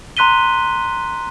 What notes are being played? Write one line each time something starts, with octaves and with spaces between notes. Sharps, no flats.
A#5 C6 F#6 B6 D#7 G7